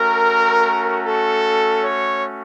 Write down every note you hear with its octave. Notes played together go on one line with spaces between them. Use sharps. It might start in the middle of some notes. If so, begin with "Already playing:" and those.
Already playing: A3 C#4 F#4 A#4
A4
C#5